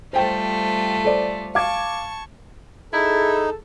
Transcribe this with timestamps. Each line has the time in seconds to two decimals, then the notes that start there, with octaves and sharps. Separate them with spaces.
0.13 G3 A3 F4 C5 G5
1.04 A4 C5 D5
1.55 F5 A5 C#6 D6 G#6
2.93 D#4 E4 G#4 A4